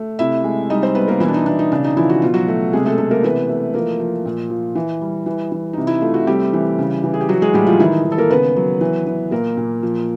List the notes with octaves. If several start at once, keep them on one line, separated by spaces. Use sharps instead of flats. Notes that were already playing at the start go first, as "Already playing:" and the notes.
Already playing: A3
C3 E4 E5
G#3
G3 D#4 D#5
C4 C5
G3 B3 B4
A#3 A#4
B2 E3 E4
D4
D#4
B2 D4
D#4
C#3 D4
D#4
E3 F3 E4
F#4
B2 F4
F#3 F#4
A3
C3 G#3 G#4
A3 A4
C3 A3 A4
A#3 A#4
E3 B3 B4
A3
F3 A#3 A#4
F3
A#2
F3
E3
G3
E3
E3
C3 D#4
E4
A3 F4
F#4
G3 C4 G4
E3
C#3
E3
G#4
G4
F#3 F#4
G#3 G#4
A2 G3 G4
F3 F4
D#3 E3 E4
D#4
D#3
A4
A#3 A#4
C#3 B3 B4
F#3
E3
E3
A#2 A#3 A#4
A#2
F3